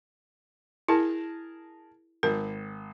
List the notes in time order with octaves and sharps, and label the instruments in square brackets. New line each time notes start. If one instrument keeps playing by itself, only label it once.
[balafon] E4 [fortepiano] G#4 A#4 A5
[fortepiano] G#1 [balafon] A#4